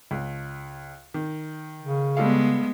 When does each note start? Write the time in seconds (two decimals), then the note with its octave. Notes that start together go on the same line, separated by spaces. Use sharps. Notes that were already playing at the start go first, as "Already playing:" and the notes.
0.11 C#2
1.14 D#3
1.82 C#3
2.17 G3 G#3 B3 A4 F5